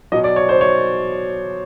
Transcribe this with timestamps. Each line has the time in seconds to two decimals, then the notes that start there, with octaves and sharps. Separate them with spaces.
0.12 B2 F#3 D#5
0.24 D5
0.36 C#5
0.49 C5
0.61 C#5